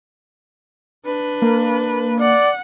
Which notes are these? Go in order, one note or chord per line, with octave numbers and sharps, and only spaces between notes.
D4 B4
A#3
D5 F#5